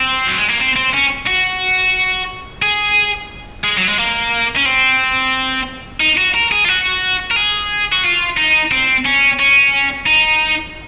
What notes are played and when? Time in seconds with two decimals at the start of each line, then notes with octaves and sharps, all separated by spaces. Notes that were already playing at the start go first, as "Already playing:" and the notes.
Already playing: C4
0.27 F#3
0.38 G#3
0.49 A#3
0.59 C4
0.76 C4
0.94 C#4
1.27 F#4
2.62 G#4
3.64 G#3
3.77 F#3
3.87 G#3
3.98 A#3
4.57 C#4
4.66 C4
6.01 D#4
6.17 F#4
6.34 A#4
6.52 G#4
6.65 F4
6.69 F#4
7.31 A#4
7.36 G#4
7.93 F#4
8.04 F4
8.37 D#4
8.71 C4
9.05 C#4
9.39 C#4
10.07 D#4